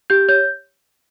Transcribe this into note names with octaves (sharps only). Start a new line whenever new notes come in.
G4 G6
C#5 G6